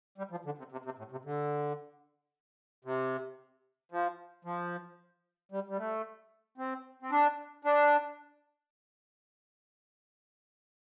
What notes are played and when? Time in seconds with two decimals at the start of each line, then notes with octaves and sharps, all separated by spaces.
0.18 G3
0.31 F3
0.45 D3
0.58 C3
0.72 C3
0.85 C3
0.98 A2
1.11 C3
1.25 D3
2.85 C3
3.92 F3
4.45 F3
5.52 G3
5.69 G3
5.78 A3
6.58 C4
7.02 C4
7.11 D4
7.65 D4